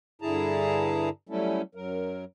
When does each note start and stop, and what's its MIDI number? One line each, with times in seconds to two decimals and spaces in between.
0.22 1.09 43
0.22 1.09 50
0.22 1.09 64
0.22 1.09 68
0.22 1.09 81
0.22 1.09 82
1.29 1.62 54
1.29 1.62 55
1.29 1.62 57
1.29 1.62 61
1.29 1.62 64
1.29 1.62 69
1.75 2.25 42
1.75 2.25 54
1.75 2.25 70